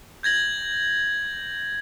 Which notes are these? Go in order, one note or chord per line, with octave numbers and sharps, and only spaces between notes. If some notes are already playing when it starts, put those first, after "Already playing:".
G6 G#6 A#6 F#7